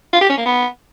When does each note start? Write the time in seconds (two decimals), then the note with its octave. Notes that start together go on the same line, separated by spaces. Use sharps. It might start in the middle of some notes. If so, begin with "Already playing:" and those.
0.13 F4
0.21 G4
0.29 C#4
0.37 A#3
0.46 B3